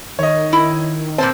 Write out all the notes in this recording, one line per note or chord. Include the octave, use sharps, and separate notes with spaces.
D#3 C#5 D#5
E4
A#2 C4 C5 A5